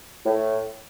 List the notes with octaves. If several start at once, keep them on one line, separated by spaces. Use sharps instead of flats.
A2